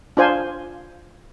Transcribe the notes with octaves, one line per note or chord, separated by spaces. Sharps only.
D4 F4 C5 G#5